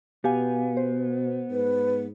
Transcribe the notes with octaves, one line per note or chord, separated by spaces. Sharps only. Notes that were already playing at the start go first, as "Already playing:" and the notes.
B2 B3 G4 F5 G#5
C5
G#2 B4